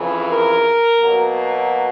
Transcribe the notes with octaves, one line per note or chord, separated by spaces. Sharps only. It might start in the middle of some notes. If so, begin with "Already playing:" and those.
Already playing: F2 C#3 E3
A#4
B2 F#3 A#3